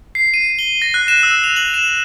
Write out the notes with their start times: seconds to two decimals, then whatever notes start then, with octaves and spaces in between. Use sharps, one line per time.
0.15 C7
0.34 D#7
0.59 G7
0.82 A#6
0.94 F#6
1.08 E7
1.23 E6
1.44 F7
1.56 F#7
1.74 E7